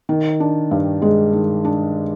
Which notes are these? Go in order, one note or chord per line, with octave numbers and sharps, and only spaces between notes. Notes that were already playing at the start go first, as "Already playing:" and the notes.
D#3
D4
G2
G#3
D#3
D4